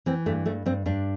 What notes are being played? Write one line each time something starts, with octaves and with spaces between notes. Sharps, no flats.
E3 C4
G2 A3
G2 A3
G2 C4
G2 D4